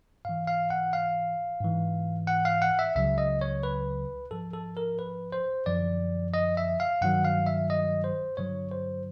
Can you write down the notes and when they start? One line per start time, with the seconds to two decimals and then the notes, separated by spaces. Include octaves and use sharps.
0.25 G#2 E3 F5
0.47 F5
0.70 F#5
0.93 F5
1.61 G#2 E3
2.27 F#5
2.45 F5
2.62 F#5
2.79 E5
2.96 C#2 C#3 F#3 E5
3.18 D#5
3.41 C#5
3.63 B4
4.31 G#2 F3 A4
4.53 A4
4.77 A#4
4.99 B4
5.32 C5
5.66 F#2 D3 F3 D5
6.34 D#5
6.57 E5
6.80 F5
7.01 G2 D#3 F#3 F#5
7.25 F5
7.47 E5
7.70 D#5
8.04 C5
8.37 G2 D3 F#3 C#5
8.71 C5